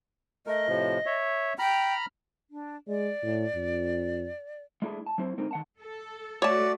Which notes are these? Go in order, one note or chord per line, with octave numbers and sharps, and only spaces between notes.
A3 A#4 D#5
A2 C3 F3
C#5 E5
G5 A#5 B5 F6
D4
G#3 D5
A2
F2
G#3 A3 D4 E4 F#4 G#4
A5
F#3 C4 E4 C5
D3 G#3 C4 D#4 A#4
D#3 F#5 A5
A4
A3 F#4 C#5 D5 A5